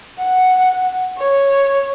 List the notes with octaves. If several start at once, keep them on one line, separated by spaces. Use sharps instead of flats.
F#5
C#5